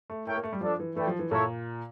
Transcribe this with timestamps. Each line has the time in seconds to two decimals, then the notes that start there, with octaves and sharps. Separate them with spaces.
0.10 A3
0.26 A3 E4 A#4 C#5 G5
0.36 A#3
0.44 A3
0.53 G3
0.61 F3 D4 A4 D5
0.80 E3
0.96 E3 A3 E4 A4 D5 G5
1.07 F3
1.19 E3
1.31 A#2 E4 A4 C#5